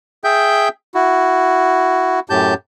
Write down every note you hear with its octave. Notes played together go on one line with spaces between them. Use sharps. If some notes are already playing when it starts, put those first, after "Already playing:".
G#4 E5 G5 G6
E4 F#4
F#2 A2 G4 A5 G6